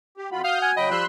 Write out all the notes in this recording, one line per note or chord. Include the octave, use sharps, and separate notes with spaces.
G4
F2 F4 F#4 B5
F5 D#6 F6 G6
F#5 G#5
C#3 F#3 D#5 G5 B5
F3 G3 C6 E6 F#6